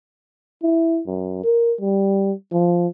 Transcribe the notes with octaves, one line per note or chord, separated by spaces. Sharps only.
E4
F#2
A#4
G3
F3